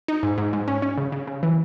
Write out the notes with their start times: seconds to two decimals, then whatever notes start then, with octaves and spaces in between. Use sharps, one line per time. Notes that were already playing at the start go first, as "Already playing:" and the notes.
0.08 D#4
0.23 G#2
0.38 G#2
0.53 G#2
0.68 C#4
0.82 C#4
0.98 C#3
1.12 C#3
1.27 C#3
1.43 E3